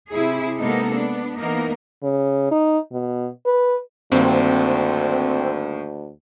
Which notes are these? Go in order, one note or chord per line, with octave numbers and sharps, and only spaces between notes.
C3 E4 G#4
C3 G#3 A#3 B3 D#4 A4
B3 D4
E3 A#3 B3 D#4 A#4
C#3
D#4
B2
B4
D2 G2 D#3 A#3 C4